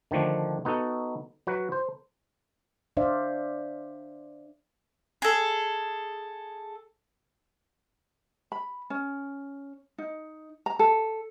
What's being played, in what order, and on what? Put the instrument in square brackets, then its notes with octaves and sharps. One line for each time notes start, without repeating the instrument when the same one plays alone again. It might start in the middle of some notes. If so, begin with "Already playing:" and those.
[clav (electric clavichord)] D3 D#3 F3 A3 D4
B3 D#4 F#4 A4
F#3 F#4 B4
C5
[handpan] D4 C5 D5 E5 F5
[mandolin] G#4 A4
[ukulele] B5
C#4
D#4
A#5
A4